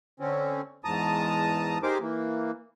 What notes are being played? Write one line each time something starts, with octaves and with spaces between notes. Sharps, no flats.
D3 C4 C#4
E2 G#2 A5 A#5 D#6
D#4 G4 G#4 A#4 C5 D6
E3 A#3